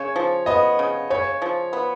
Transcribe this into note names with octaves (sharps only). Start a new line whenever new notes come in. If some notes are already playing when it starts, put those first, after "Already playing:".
Already playing: C#3 C#5
F3
B3 D#5
C#3
C#3 C#5
F3
B3